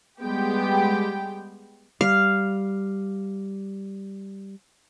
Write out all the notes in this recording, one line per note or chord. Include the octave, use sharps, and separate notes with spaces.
G3 G#3 B3 G4 G5
G3 F5